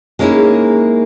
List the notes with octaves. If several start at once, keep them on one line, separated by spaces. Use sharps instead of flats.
G#3 A#3 C#4 D#4 E4 G#4